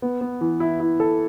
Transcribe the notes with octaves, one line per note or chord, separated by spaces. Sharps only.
B3
B3
E3
E4
E4
A4